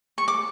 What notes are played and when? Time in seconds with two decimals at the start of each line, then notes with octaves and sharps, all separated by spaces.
0.18 C#6
0.28 D6